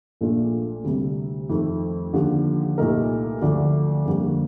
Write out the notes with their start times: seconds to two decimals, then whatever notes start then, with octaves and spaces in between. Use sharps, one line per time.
0.21 A#1 A#2 A3 D4 F4
0.84 D2 C3 G3
1.50 F2 D#3 A3
2.13 D#2 D3 F3
2.78 C2 A#2 A3 D#4 A#4
3.42 D2 D3 F3 A3 D4
4.06 F2 D3 G3 A#3